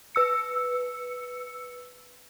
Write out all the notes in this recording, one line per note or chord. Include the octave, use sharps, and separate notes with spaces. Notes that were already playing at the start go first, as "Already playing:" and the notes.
B4 E6 C#7